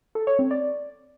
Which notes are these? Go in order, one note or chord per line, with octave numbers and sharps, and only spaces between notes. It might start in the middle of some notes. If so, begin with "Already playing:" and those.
A4
C#5
C4
D5